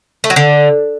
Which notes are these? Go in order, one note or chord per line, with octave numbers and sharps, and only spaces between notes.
A3
F#3
D3